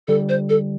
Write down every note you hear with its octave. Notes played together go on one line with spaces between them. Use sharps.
D3 G3 A4
C5
A4